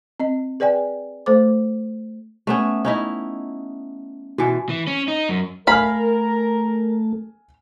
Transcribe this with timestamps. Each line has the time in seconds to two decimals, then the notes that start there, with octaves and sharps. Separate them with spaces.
0.20 C4 D#5
0.60 G#4 B4 D5 G5 G#5
1.26 A3 A4 C5 D6
2.47 A3 B3 C#4
2.85 C#4 D#4 E4
4.38 B2 E3 F#4 G#5
4.69 E3
4.87 C#4
5.08 D#4
5.29 F#2
5.67 A3 A#4 F5 G#5 B5 F6